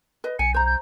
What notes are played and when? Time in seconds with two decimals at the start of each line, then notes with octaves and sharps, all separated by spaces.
0.24 B4 D#5
0.39 B1 G#5 C#7
0.54 C5 A#5 G6
0.66 G6